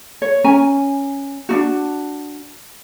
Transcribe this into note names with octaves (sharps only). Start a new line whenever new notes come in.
C#5
C#4 G#5 A#5
D4 D#4 F#4